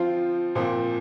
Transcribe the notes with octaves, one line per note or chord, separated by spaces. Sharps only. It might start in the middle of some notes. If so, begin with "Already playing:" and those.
Already playing: F3 C4 F4
A#2 F3 C4